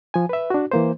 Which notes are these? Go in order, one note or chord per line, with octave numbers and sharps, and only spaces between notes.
F3 G#5
B4 E5
D4 F#4
E3 A#3 C5